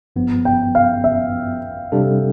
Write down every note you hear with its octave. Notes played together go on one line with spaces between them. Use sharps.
G1 G2 F3 B3
G5
F5
E5
C3 G3 D4 A4